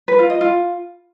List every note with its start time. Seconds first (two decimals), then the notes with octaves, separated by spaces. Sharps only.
0.08 B4
0.19 F4
0.30 D#5
0.41 F4